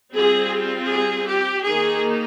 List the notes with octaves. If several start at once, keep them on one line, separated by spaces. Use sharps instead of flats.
G3 C4 F4 G#4
G#4
G4
D#3 A#3 D#4 G#4